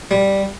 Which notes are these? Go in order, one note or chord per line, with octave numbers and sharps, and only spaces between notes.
G3